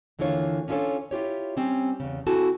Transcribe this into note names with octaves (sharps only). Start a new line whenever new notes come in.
D#2 D3 E3 A#3 F4 C#5
C#4 D4 F4 G#4 A4 C#5
E4 F4 G4 C#5
G3 C4 C#4
E2 C#3
C4 E4 F#4 A4 G#5 A5